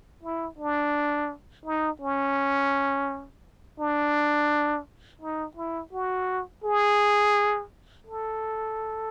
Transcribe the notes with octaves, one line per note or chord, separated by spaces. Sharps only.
E4
D4
D#4
C#4
D4
D#4
E4
F#4
G#4
A4